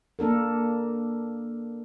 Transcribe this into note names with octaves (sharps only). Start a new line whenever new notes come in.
A#3 D4 A4 A#4